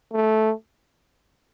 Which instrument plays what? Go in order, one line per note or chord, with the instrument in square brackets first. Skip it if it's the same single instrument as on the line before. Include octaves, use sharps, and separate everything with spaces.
[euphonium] A3